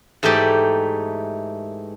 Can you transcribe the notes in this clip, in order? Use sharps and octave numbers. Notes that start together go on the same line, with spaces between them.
G#2 E3 A3 D#4 G4 D5